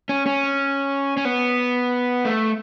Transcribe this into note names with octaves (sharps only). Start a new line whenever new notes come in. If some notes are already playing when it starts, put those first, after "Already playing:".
C#4
C#4
C#4
B3
A3